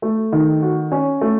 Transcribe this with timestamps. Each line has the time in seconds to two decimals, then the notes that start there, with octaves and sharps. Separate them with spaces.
0.02 A3
0.32 D#3
0.62 F#4
0.92 C#4
1.21 A3